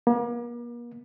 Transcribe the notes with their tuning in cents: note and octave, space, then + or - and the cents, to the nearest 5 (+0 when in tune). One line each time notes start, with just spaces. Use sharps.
A#3 +40